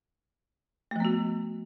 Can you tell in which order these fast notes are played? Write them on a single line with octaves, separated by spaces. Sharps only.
A3 F3 B3 F#4